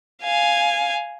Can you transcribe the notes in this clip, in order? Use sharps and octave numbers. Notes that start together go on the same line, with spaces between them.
F5 G#5